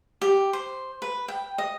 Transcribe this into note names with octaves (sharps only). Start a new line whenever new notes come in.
G4
C5
B4
G5
D#5